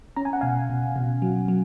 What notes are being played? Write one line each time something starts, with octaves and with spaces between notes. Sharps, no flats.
C#4 A#5
G#5
F#5
B2 F5 G#5
B2
B2
F#3
F#3